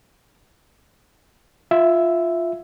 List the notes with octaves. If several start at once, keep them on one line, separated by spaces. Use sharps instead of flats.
F4 E5